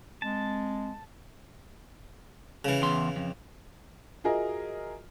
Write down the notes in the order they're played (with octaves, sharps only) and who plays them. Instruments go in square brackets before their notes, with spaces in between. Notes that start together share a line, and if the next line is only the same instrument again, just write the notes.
[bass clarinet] G#3 [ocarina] C4 [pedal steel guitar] A5
[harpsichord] C#3 E3
[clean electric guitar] E2 C6
F2
[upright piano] F4 F#4 G#4 A#4 D#5 E5